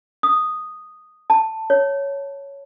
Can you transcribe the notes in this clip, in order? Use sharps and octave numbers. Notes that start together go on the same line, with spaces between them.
D#6
A5
C#5